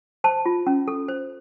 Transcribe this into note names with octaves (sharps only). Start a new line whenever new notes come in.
C5 A5
F4
C#4
A4
C5